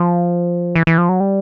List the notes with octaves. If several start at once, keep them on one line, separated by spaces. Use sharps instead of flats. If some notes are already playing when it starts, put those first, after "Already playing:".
Already playing: F3
E3
E3
F3
F#3
G3